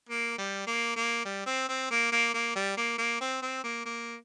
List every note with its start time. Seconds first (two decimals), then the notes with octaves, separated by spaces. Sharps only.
0.09 A#3
0.38 G3
0.67 A#3
0.96 A#3
1.25 G3
1.46 C4
1.69 C4
1.90 A#3
2.12 A#3
2.34 A#3
2.56 G3
2.77 A#3
2.98 A#3
3.21 C4
3.42 C4
3.64 A#3
3.86 A#3